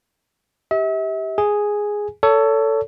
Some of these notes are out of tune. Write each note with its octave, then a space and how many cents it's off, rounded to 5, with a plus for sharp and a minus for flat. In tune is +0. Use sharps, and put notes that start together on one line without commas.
G4 +0 E5 -40
G#4 +0 G#5 +0
A4 +15 C#5 +30